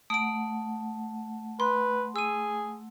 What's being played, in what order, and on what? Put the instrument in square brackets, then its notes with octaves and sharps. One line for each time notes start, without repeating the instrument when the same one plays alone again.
[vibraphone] A3 F#5 [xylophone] D#6 D7
[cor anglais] B4 [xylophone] C6
[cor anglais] G#4 [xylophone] E6 D#7